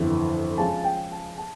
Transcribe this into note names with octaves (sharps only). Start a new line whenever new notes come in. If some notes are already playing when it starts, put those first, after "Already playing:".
Already playing: G1 F2 E3
C#2 C#3 F3 A5
G5
A5
A5